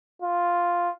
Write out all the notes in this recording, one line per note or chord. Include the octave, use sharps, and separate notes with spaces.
F4